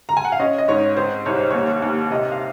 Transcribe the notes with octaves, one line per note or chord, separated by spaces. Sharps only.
A#5
G#5
F#5
F5
C#4 D#5
D#5
G#2 C#5
C4 C5
C2 C#5
C5
D#2 C#5
D#2
C3 D#5
F5